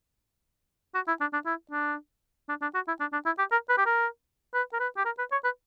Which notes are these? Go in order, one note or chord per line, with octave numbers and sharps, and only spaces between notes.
F#4
E4
D4
D4
E4
D4
D4
D4
F#4
E4
D4
D4
E4
G4
A#4
B4
G4
A#4
B4
A#4
B4
G4
A#4
B4
C#5
B4